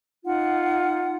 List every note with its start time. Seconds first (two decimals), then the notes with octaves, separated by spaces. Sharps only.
0.25 D#4 F4 F#5